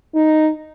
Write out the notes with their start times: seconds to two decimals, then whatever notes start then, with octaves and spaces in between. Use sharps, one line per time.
0.14 D#4